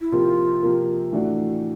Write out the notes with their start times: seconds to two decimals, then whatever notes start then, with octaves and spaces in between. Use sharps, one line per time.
0.01 E4
0.12 C3 F3 A#3 F4
0.63 C3 F3 A#3
1.12 A2 E3 A3 D4 F#4